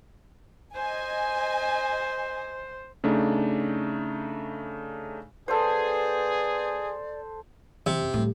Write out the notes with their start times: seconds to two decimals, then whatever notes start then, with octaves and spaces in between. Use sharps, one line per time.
0.75 C5 D#5 G#5
3.04 C#3 A3 D4 D#4
5.48 B3 G#4 A4 C5 D5
7.86 C3 E3
8.01 F#2
8.14 A2 G3